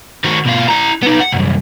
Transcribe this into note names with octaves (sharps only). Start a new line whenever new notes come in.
D#3 F#4
B2 F4
E4 A#5
B3 D#4
F#5
C2 F#2